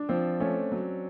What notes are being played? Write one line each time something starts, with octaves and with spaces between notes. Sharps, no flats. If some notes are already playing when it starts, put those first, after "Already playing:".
Already playing: D4
F3 C4
A3 C#4
F#3